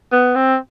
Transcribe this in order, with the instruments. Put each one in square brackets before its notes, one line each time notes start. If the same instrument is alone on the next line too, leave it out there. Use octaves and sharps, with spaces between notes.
[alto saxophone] B3
C4